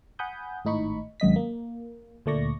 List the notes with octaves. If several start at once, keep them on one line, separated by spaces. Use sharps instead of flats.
F#5 G#5 B5 D#6 G6
G#1 A2 D#4 B5 C#6
G#1 F#2 D#5 B6
A#3
D2 A#2 A3 D5 C#6 A#6